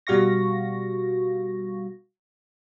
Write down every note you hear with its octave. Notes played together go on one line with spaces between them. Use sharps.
B2 G3 F#4 F5 C#6 A#6